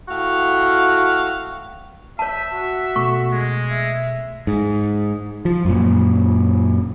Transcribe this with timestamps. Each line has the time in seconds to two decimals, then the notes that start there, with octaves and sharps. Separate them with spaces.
0.09 A2 F#4 F5
2.19 C#5 E5 A5
2.54 F#4
2.96 B2 A3 C#6
3.32 G#3
3.71 E5
4.47 G#2
5.45 F3
5.65 F#2 A#2